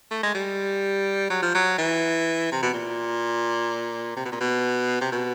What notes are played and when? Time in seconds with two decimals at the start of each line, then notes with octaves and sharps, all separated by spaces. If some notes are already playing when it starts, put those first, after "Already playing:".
0.11 A3
0.23 G#3
0.35 G3
1.30 F#3
1.42 F3
1.54 F#3
1.78 E3
2.52 C3
2.63 B2
2.73 A#2
4.16 C3
4.25 B2
4.32 A#2
4.41 B2
5.01 C3
5.12 B2